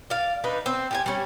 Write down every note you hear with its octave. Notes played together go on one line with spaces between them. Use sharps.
D5 F5
D4 D#4 B4
C4
G4 G#4 G#5
G3 C#4